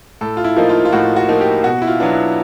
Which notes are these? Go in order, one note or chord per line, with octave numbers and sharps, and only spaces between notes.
A2 A4
F4
E4
F3 A#3 D#4
F4
F4
A2 F#4
F#4
F3 A#3 D#4
G4
B2 F#4
E4
F4
F#3 B3 D4
E4